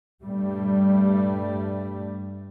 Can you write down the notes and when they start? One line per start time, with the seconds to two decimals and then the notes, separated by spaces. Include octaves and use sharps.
0.23 G2 G3 A3